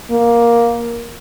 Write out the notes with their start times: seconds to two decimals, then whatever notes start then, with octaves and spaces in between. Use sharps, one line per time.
0.11 A#3